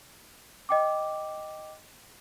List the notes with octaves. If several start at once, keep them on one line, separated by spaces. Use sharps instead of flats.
D#5 G5 D6